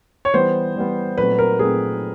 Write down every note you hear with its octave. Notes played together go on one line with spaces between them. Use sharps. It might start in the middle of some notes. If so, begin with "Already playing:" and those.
C#5
E3 G3 B3 C5
E3 G3 B3
A#2 F#3 A3 C4 B4
A#4
A#2 F#3 A3 C4 G#4